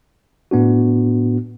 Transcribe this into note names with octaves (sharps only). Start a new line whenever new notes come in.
A2 B3 D4 F#4